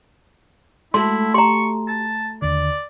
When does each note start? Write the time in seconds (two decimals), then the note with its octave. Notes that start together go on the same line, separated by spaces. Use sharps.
0.94 G#3 A3 E4 F#4 C6
1.34 G4 A#5 C6 C#6
1.88 A5
2.42 D#2 D3 D5